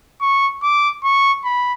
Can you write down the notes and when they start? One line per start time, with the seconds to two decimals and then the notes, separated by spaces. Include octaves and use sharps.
0.21 C#6
0.63 D6
1.04 C#6
1.44 B5